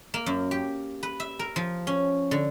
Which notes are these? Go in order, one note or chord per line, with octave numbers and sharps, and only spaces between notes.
A#3
F#2
G4
B4
E5
A#4
F3
C#4
D3